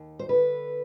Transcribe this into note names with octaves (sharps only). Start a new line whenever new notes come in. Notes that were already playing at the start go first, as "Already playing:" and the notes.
Already playing: D#2
C5
D3 B4